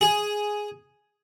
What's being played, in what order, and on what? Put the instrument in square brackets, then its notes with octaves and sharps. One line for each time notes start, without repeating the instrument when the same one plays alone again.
[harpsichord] G#4